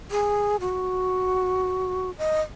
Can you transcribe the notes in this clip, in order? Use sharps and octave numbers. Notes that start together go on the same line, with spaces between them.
G#4
F#4
D#5